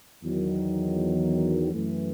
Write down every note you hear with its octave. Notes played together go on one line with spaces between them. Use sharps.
E2 D#3 F#3
F#2 E3 A3